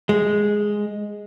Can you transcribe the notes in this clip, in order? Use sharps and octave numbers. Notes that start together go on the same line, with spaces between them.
G#3